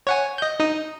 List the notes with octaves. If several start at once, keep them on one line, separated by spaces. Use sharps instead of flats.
C#5 F#5 G#5
D#5 G6
D#4 D#6